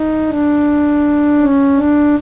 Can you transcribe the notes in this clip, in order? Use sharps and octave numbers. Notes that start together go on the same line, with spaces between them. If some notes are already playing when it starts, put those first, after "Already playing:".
Already playing: D#4
D4
C#4
D4